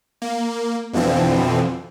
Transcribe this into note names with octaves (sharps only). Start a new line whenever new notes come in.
A#3
F2 B2 D3 E3 F3 C4